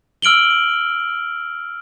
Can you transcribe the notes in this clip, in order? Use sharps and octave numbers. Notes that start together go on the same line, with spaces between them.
E6 F6 D7 F#7 G7